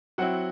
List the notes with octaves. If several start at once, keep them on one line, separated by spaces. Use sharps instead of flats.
F#3 C4 E4 F#4 F#5